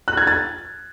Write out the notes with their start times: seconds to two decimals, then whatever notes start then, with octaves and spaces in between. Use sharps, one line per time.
0.08 F#6
0.17 G#6
0.27 A6